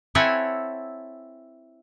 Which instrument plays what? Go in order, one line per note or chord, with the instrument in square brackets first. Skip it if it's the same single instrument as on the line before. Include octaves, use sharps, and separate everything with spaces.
[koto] C4 E4 A4 C#5 F#5 G#5